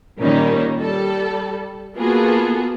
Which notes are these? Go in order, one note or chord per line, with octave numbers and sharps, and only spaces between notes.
A#2 D#3 G3 A#3 C#4 D#4
G3 A4
A#3 B3 F4 F#4 G#4 A4